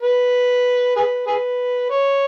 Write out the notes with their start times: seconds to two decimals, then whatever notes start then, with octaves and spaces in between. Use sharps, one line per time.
0.02 B4
0.96 G#4 B4
1.27 G#4 B4
1.90 C#5